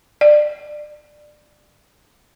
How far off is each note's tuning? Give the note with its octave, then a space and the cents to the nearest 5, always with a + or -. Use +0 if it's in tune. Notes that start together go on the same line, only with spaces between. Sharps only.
D5 +25